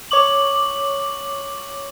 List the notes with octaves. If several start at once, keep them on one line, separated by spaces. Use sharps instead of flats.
C#5 C#6 D6 F#7